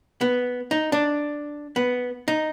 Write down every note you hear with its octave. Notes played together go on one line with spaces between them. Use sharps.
B3
D#4
D4
B3
D#4